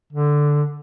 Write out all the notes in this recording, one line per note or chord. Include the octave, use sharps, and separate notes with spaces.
D3